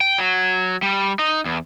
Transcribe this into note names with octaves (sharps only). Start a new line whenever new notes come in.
G5
F#3
G3
D#4
E2